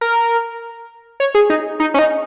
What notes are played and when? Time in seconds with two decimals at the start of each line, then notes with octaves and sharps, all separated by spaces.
0.01 A#4
1.20 C#5
1.35 G#4
1.50 D#4
1.80 D#4
1.94 C#4
1.99 D#4